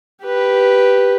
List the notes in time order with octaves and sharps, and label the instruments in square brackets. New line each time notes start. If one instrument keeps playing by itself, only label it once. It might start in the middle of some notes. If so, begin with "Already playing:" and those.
[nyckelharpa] G4 B4